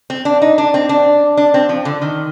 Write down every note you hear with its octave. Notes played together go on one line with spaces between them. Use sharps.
C4
D4
D#4
D4
C4
D4
D4
C4
F3
D3
D#3